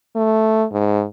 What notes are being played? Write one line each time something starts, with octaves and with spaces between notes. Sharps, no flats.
A3
G#2